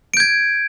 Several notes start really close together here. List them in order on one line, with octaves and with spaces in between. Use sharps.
D7 G6 G#6